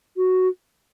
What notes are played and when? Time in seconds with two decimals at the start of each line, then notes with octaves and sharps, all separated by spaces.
0.17 F#4